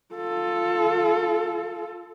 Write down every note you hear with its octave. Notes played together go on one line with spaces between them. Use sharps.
F4 A4